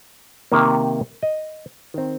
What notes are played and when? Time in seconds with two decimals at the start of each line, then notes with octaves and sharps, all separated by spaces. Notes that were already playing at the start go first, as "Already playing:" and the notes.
0.52 C3 D#3 A#3
1.23 D#5
1.94 D#3 C4